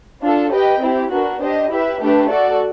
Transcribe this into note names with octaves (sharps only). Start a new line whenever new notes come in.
D4 F4 A4
G4 B4 D#5 G5
C4 E4 G4
B3 D4 F#4 A#4
D4 G4 C5 D#5
E4 G4 B4 E5
A3 D4 G4 B4
F#4 A4 D5